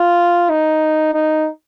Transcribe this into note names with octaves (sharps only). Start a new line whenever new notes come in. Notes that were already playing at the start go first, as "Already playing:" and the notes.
Already playing: F4
D#4
D#4